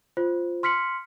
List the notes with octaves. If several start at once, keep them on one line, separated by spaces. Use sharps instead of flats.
F4 C5
C6 F6 B6 C#7 F#7